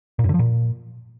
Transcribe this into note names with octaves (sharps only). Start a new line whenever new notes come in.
A#2
F#2
D3
F3
A#2